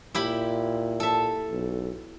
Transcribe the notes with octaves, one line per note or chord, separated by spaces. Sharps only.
A#2 E4 G4 B5
A4 E5
B1